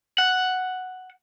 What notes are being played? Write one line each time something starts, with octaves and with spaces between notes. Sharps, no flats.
F#5